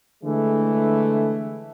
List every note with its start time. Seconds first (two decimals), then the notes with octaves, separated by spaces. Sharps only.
0.24 D3 E3 G#3 A3